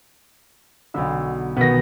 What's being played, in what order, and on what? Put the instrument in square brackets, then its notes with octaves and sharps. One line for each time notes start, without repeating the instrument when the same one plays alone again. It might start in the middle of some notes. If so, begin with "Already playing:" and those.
[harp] B1 B3 E6 [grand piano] D3
[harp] B2 D#3 [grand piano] B3 A#6